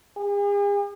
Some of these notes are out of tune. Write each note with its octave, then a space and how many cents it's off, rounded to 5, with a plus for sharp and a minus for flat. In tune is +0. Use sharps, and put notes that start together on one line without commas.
G#4 -45